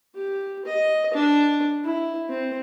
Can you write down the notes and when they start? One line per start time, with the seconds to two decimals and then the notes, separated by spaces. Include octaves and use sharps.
0.15 G4
0.65 D#5
1.14 D4
1.84 E4
2.29 C4